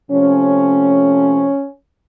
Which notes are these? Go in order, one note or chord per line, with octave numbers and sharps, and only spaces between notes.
C3 F3 A3 C#4